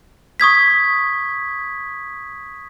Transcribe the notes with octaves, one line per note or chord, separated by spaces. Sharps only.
C#6 D#6 G#6 B6